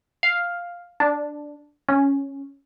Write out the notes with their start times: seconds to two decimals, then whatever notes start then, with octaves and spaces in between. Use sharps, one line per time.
0.23 F5
1.00 D4
1.89 C#4